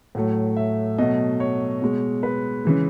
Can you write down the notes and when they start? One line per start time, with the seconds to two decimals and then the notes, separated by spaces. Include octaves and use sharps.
0.15 A2 F#3 A3
0.57 E5
0.98 B2 F#3 A3 D#5
1.40 C#5
1.82 B2 G#3
2.23 B4
2.65 C#3 E3 G#3